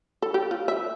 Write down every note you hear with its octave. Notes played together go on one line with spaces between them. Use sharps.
A4
G4
F4
E5